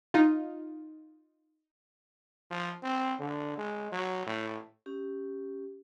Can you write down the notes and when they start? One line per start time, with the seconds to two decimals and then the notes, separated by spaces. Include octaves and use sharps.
0.14 D#4 F4
2.51 F3
2.83 C4
3.20 D3
3.57 G#3
3.92 F#3
4.27 A2
4.86 C#4 G4